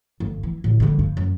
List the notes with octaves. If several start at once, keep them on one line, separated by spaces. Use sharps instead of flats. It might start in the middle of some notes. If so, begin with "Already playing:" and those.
G1
E3
A2 D3
D3 G3
G2
F#2